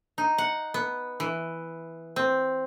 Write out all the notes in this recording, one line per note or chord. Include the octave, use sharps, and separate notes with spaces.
D#4
F#5
B3
E3
C4